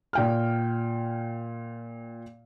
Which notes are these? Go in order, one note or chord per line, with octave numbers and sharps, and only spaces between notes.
A#2 G5 F6